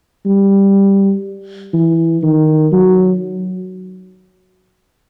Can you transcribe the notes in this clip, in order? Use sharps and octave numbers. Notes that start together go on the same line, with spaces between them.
G3
E3
D#3
F#3